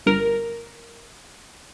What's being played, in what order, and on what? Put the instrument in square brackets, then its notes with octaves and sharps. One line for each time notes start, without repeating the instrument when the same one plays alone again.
[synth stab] G1 A#4